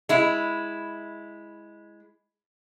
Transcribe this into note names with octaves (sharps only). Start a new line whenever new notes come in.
G#3 E4